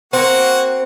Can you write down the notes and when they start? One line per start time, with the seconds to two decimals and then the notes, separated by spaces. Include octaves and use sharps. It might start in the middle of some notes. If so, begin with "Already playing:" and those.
0.13 A#3 C4 F#4 F#5